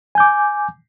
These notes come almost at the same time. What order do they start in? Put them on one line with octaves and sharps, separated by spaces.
G#5 G6 D6